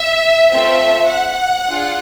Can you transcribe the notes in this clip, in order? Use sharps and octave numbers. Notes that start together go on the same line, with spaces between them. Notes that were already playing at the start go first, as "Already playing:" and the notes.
Already playing: E5
A3 C4 F4 A4 E5
F#5
D4 F4 G#4